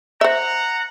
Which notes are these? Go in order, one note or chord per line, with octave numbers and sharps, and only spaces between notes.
C5 E5 F#5 A#5